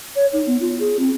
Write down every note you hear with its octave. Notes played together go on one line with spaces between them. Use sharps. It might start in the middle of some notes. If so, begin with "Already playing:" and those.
C#5
D#4
B3
F4
G#4
C4